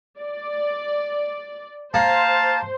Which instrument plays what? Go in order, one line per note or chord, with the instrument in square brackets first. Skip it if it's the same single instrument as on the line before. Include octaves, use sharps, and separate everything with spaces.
[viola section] D5
[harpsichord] A#3 [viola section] C5 [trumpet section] F5 A5